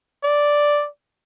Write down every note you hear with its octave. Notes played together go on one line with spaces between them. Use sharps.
D5